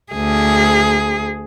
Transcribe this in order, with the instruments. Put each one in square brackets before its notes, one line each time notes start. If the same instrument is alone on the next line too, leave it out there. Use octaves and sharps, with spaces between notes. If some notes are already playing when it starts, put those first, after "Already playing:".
[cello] D2 G#4